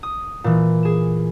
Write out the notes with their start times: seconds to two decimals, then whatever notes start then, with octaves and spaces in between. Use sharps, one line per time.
0.03 D#6
0.44 A#2 E3
0.83 G#4 E7